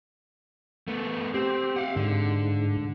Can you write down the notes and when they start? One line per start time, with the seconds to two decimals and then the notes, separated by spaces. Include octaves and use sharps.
0.88 A3 B3
1.34 C4 G4
1.76 F5 F#5
1.96 G#2 D3